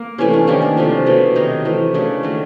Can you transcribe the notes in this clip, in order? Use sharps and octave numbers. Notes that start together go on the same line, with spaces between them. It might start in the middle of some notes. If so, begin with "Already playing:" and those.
Already playing: A#3
C3 E3 A3 C#4
D4
D#3 G3 A#3 C#4
D4
C3 F3 A3
B2 F#3 A3
C3 D#3 F#3 D#4
E3 A3
C#3 F#3 A3 D4
D#3 F#3 A3